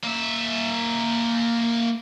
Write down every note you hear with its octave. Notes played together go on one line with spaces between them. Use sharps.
A#3 E5